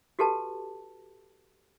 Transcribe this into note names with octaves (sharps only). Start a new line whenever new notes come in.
F#4 G4 A4 B4 A5